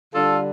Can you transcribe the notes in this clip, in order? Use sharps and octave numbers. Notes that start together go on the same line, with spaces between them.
D3 G3 D4 F4 A4